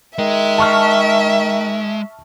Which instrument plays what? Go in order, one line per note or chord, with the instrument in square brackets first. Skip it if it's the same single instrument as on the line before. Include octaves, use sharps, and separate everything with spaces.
[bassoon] D#3 [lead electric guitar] G#3 [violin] E5
[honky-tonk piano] A5 C#6 F6